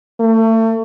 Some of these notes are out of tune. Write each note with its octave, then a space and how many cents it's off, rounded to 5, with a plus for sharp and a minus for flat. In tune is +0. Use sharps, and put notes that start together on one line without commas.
A3 +30